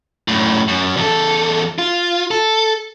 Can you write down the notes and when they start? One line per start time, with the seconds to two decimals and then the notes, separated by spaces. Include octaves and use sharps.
0.28 F#2 A2
0.68 F#2
0.97 E2 A4
1.79 F4
2.31 A4